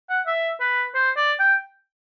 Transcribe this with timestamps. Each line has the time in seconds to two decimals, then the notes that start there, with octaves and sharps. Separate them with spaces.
0.10 F#5
0.27 E5
0.61 B4
0.95 C5
1.17 D5
1.39 G5